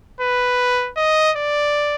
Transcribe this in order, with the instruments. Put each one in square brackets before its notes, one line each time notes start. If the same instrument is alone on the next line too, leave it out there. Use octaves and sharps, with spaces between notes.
[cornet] B4
D#5
D5